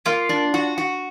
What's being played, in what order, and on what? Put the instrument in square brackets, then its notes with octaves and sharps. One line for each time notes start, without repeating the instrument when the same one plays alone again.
[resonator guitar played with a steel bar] A#3 [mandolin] F4
[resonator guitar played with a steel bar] D4
F#4
F#4